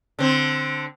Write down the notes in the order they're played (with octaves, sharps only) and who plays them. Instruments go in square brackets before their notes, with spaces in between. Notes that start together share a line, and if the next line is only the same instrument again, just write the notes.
[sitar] D3 C4